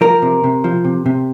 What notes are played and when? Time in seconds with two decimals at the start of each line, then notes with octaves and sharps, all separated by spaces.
0.01 F3 A#4
0.22 C3
0.44 C3
0.64 F3
0.85 C3
1.06 C3